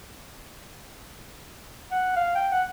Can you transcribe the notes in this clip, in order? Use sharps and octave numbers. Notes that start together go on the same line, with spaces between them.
F#5
F5
G5
F#5